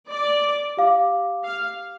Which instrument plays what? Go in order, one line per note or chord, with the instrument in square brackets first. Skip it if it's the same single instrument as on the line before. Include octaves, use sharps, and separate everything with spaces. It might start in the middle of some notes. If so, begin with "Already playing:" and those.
[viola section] D5
[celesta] G4 F5 D6
[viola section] F5